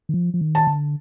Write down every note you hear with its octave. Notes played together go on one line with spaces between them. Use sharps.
D#3
F3
F3
D#3
A5
D3